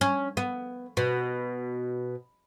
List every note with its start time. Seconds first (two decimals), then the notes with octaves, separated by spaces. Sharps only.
0.01 C#4
0.37 B3
0.97 B2